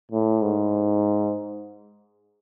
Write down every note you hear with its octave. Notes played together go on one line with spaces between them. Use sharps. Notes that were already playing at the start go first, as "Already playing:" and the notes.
A2
G#2